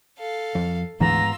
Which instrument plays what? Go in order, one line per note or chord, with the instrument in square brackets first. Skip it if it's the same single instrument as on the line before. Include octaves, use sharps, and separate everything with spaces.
[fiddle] A4 F5
[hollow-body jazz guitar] F2
[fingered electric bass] D2 E3 D4 [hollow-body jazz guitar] G#2 B3 [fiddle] F4 E6 [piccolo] A#5